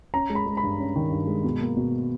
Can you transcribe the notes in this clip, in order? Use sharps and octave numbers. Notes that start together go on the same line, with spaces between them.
C#4 A#5
G#3
B5
G#3
B5
G2
C#4
D#3
G2
G#3
B2
A#3
B2